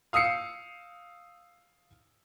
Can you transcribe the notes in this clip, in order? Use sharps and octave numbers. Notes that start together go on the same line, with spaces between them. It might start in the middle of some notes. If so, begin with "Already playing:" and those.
F5 D#6 E6 C7 C#7